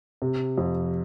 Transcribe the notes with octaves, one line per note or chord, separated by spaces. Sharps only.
C3
F2